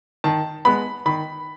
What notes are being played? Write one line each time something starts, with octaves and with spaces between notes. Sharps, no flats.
D#3 A5
G#3 B3 B5
D#3 B5